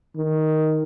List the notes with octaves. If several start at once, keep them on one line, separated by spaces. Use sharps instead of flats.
D#3